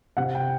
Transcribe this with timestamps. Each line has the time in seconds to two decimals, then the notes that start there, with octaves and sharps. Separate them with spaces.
0.17 C3 F#5
0.35 G5